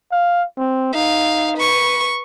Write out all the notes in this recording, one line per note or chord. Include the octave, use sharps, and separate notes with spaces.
F5
C4
D#4 F5
B4 C#6